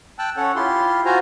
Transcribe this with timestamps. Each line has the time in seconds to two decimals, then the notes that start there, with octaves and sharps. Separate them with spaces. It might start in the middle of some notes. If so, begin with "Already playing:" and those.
0.19 G5 A5 E6 F#6
0.37 C#4 A4 C#5 F#5
0.56 E4 F4 G4 C6
1.05 F4 F#4 C5 G#5 A#5